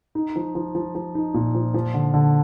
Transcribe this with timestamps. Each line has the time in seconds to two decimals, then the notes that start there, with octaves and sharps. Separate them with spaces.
0.15 D#4
0.36 F3
0.55 F3
0.75 F3
0.95 F3
1.15 D#4
1.34 A#2
1.55 F3
1.74 F3
1.94 D3
2.14 D3